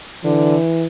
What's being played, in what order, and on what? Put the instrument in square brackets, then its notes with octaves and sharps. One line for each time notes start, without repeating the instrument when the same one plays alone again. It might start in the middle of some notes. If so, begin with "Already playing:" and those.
[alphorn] D3 [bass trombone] E3